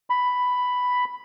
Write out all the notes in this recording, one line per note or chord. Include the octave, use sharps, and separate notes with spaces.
B5